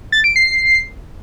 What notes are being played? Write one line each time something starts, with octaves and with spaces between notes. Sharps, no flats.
A6
D7
C7